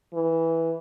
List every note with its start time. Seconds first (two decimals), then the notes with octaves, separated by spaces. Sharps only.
0.14 E3